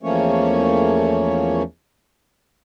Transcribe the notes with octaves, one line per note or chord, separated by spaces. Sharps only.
E2 F3 A3 A#3 C#4 C#5